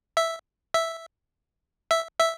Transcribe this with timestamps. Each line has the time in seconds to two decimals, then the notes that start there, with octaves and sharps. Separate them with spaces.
0.17 E5
0.74 E5
1.91 E5
2.20 E5